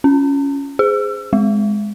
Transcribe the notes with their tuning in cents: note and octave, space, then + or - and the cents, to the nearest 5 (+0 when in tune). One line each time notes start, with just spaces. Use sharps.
C#4 +10
G#4 -5
G#3 +0